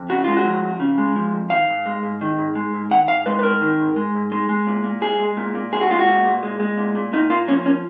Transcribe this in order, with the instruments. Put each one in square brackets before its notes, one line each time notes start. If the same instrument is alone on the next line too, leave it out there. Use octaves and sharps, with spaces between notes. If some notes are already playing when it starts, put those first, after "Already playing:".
Already playing: [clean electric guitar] F2
C#3 F#4
G#3 F4
F#4
F3
F2
C#3
G#3
F3
F2
D#3 F5
G#2
G#3
G#2
D#3
G#2
G#3
G#2
D#3 F#5
G#2 F5
G#3 B4
B4
G#2 A#4
D#3
G#2
G#3
G#2
G#3
G#3
A#2
A#2
G#3 G#4
G#3
A#2
A#2
G#3 G#4
F#4
G#3 F4
F#4
A#2
A#2
G#3
G#3
A#2
A#2
A#2 D#4
A#3 F4
F3 C#4
C#4